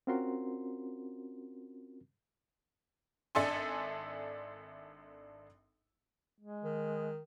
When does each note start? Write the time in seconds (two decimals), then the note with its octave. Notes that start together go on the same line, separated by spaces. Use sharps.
0.07 C4 C#4 F4 F#4 A#4 C6
3.35 G#1 D4 A4 E5 G#5 C6
6.40 G#3
6.64 D#3